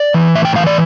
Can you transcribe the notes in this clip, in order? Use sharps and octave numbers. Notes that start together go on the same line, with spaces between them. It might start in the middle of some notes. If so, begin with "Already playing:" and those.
Already playing: D5
E3
A2 E5
G5
E3 F5
D5